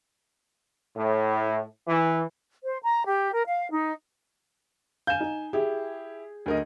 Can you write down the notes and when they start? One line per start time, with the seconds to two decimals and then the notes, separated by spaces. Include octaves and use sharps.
0.96 A2
1.87 E3
2.63 C5
2.82 A#5
3.06 G4
3.33 A#4
3.47 F5
3.72 D#4
5.07 F5 G#5 G6 E7
5.20 D#4
5.53 E4 G4 G#4
6.46 D2 A#4 D#5